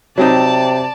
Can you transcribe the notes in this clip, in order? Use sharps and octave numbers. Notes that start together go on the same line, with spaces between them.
C3 F#3 C4 D#4 D5 A5